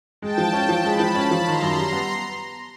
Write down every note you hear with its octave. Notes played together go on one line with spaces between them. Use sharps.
G#3 G5 A5
F3
C#4
F3
G#3 A5 B5
F3
C#4
F3
D#3 A#5 C6
F#2
G3
B3